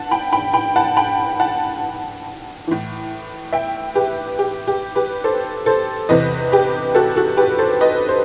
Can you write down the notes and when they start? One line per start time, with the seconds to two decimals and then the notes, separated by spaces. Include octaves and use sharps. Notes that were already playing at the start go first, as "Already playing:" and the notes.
Already playing: F#5 A5
0.11 G5 B5
0.33 G5 B5
0.53 G5 B5
0.76 F#5 A5
0.97 G5 B5
1.40 F#5 A5
2.67 A2 E3
3.53 E5 G5
3.95 G4 B4
4.39 G4
4.67 G4
4.95 G4 B4
5.24 A4 C5
5.66 A4 C5
6.09 E2 C3 E3 B4 D#5
6.52 G4 B4
6.95 F#4 A4
7.16 F#4 A4
7.37 G4 B4
7.59 A4 C5
7.81 B4 D#5
8.09 C5